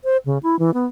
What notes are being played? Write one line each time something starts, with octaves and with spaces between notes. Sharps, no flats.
C5
C#3
E4
E3
B3